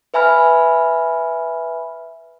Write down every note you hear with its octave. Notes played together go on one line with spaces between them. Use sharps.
B4 E5 G#5 B5 F6